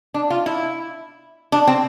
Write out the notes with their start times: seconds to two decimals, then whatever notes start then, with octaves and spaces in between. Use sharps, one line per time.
0.14 D4
0.30 F4
0.46 E4
1.52 D4
1.67 C4